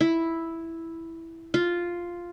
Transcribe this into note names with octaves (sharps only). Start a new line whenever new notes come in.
E4
F4